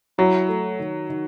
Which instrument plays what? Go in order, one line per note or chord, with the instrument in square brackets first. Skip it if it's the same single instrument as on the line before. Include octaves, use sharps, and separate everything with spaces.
[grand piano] F#3 [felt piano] E4
[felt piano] A3
D#3
D#3